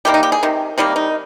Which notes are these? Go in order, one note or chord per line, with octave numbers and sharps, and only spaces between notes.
C3 D#3 G3 A#3 G4
D#4
G4
G#4
C3 D#3
C3 D#3 G3 A#3
D#4